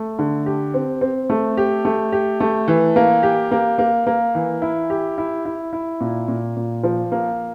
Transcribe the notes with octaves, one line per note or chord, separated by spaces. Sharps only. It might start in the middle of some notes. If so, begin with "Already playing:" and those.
Already playing: A3
D3
G4
C4
C4
A3
G4
A3
G4
A3
E3
A#3
G4
A#3
A#3
A#3
E3
E4
G4
E4
E4
E4
A#2
A#2
A#2
F3
A#3